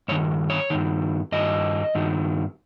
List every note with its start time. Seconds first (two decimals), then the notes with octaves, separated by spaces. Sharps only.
0.08 G2 D#3 C#5
0.50 C#5
0.70 G2 D#3
1.32 G2 D#3 D#5
1.95 G2 D#3